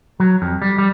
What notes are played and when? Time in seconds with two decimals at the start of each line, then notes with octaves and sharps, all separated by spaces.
0.20 F#3
0.42 F2
0.62 G3
0.78 G3